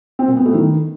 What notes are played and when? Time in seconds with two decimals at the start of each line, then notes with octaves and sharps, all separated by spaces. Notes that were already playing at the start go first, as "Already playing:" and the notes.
0.19 C4
0.28 A#2
0.37 B3
0.46 A3
0.54 D#3